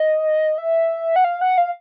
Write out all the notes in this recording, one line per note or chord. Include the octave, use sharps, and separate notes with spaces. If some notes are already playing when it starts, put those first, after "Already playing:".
Already playing: D#5
E5
F#5
F5
F#5
F5